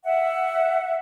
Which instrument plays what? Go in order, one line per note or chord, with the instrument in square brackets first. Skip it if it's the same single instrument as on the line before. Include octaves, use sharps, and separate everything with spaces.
[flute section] E5 F#5